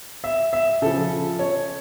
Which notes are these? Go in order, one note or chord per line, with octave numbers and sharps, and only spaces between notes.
E5
E5
C#3 F3 A4
C#5